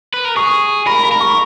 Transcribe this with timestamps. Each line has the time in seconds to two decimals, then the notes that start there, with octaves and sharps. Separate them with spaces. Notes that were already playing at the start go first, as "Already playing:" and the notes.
0.14 B4
0.25 A#4
0.36 G#4 C#6
0.86 A#4 B5
1.03 B5
1.12 A#4
1.20 C#6